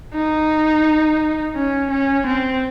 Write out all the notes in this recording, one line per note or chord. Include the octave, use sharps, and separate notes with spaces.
D#4
C#4
C#4
C4